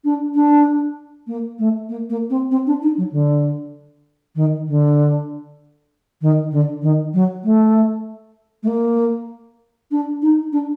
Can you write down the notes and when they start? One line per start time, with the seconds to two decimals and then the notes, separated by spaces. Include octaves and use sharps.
0.04 D4
0.34 D4
1.27 A#3
1.59 A3
1.89 A#3
2.10 A#3
2.30 C4
2.51 C4
2.67 D4
2.82 D#4
2.97 F#3
3.12 D3
4.35 D#3
4.67 D3
6.21 D#3
6.51 D3
6.82 D#3
7.13 F#3
7.44 A3
8.63 A3
8.67 A#3
9.91 D4
10.22 D#4
10.52 D4